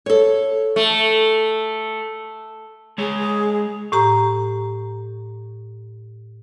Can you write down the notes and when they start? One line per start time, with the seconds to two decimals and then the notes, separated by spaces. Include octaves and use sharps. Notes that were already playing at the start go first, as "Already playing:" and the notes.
0.06 A4 C#5
0.76 A3
2.98 G#3 G#4 C#5
3.92 A2 G4 A#5